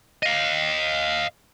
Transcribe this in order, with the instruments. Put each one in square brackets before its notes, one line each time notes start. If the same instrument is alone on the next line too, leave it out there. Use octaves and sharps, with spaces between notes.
[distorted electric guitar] D#5 F5